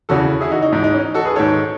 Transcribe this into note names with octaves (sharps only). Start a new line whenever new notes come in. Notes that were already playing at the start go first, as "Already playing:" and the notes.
E2 C#3 E3 F#4 A4
E4 G#4
D#4 F#4
D#4
G#2 E3 D#4
D#4
C#4
D#4
F#4 A4
G#4 B4
G#2 D#3 A4 C#5